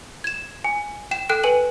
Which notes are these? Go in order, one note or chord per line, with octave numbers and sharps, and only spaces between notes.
G#6 E7
G#5
G5 E7
A4 G5 F#6 D7
B4 G#5 D#7 F#7